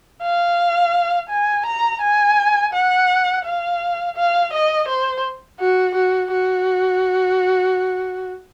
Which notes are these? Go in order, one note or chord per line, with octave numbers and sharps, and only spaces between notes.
F5
G#5
A#5
G#5
F#5
F5
F5
D#5
C5
F#4
F#4
F#4